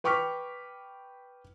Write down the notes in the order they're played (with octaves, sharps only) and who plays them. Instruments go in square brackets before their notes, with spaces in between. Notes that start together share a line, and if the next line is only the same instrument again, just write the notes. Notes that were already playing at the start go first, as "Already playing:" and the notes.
[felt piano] B4 G5 C#6 D6 F6 B6